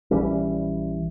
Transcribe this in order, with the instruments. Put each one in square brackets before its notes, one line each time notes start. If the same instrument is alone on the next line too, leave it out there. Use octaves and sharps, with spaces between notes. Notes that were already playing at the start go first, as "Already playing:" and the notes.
[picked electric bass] A#1 E3 G3 C#4